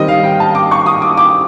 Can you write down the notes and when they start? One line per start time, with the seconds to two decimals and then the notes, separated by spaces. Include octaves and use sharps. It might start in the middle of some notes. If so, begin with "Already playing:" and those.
Already playing: D#3 G3 C4 D#5
0.08 F5
0.24 G5
0.40 A5
0.55 D6
0.71 C#6
0.86 D#6
1.02 D6
1.17 D6